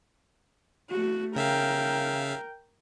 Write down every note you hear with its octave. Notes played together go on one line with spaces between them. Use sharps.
A3 F#4
C#3 A#4 E5 F5 G5